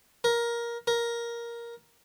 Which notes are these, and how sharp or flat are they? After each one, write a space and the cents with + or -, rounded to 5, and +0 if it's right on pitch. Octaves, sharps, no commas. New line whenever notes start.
A#4 +15
A#4 +10